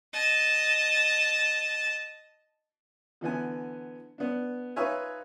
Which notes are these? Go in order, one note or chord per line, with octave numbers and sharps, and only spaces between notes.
D#5 A5
D3 E3 B3 G#5
B3 D4
D#4 F4 B4 C#5 E5 G#5